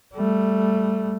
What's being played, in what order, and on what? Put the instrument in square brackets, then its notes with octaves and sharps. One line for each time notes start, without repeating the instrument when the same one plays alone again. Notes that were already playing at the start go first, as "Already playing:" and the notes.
[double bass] G3 A3